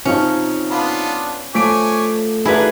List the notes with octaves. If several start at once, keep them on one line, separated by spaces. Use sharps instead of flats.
C3 F3 C#4 D#4
B3 D4 F4
F3 A3 C#5 G#5 D6 B6 D7
D4 E4 F#4 G#4 A#4 B4 F#5